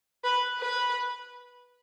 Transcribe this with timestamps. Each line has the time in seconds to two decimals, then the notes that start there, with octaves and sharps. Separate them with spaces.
0.24 B4
0.60 B4